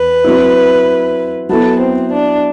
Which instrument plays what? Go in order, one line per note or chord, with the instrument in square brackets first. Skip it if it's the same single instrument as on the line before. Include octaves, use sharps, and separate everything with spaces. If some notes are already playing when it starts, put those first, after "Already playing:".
Already playing: [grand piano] E2 [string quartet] B4
[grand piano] F#3 C4 E4
[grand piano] F#3 B3 E4 [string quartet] A4
[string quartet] C4
D4